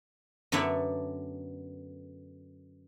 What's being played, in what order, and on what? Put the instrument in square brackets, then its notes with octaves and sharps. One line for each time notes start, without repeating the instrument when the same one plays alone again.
[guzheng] F#2 D3 B3 D4 C#5 E5